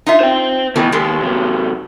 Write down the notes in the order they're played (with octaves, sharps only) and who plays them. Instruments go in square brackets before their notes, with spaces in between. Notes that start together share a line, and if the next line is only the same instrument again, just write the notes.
[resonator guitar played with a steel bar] D#4 F4 E5
[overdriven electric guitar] C5 G5
[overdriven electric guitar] B2 B4 [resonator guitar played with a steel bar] D#3 E3 A3
[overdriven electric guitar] D#2 [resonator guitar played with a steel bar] G#3 B3 A4
[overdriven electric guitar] C3 F#3